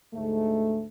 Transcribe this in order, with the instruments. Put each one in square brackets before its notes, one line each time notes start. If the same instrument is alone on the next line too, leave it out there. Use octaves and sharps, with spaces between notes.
[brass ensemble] D2 G#2 A3